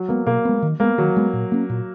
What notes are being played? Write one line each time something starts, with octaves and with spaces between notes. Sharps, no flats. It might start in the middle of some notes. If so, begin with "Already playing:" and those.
Already playing: F#3
G#3 A#3 B3
B2 A#3
G#3 B3
D#3
G#3 A#3 B3
D#3 F#3
G#3 B3
A#2
A#3 C#4
A#2